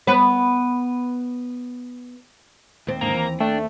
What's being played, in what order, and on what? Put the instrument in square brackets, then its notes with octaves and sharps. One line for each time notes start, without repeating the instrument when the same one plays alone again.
[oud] B3 B4
D#2 C4
[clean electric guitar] G#2 D3 D#3 [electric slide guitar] A#3 [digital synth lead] A#5
[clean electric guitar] E3
[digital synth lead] A3 [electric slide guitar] D4 [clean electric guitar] G5